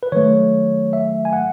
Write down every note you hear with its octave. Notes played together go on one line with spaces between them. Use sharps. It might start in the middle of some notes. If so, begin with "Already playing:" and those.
B4
D#3 F#3 A3 C#5
E5
G#5
F#5